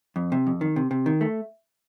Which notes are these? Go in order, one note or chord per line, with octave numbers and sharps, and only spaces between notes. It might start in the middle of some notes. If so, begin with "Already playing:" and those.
F2
C3
F2
D#3
C3
C3
D#3
A3